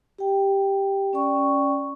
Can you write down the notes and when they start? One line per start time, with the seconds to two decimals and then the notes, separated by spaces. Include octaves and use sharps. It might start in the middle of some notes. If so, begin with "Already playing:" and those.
0.18 G4 G5
1.13 C#4 D5 G5 C#6